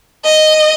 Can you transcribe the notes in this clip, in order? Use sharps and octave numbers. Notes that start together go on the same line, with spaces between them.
D#5